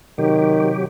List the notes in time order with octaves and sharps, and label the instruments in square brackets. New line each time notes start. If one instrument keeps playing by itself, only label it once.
[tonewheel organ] C3 F#3 G4 [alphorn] D#3